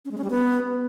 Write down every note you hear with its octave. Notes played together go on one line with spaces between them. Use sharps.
C#4
G#3
C#4
G3
B3